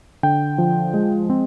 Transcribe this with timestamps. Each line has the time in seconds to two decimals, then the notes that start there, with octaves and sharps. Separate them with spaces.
0.23 D3 G5
0.58 F3
0.94 G#3
1.30 C4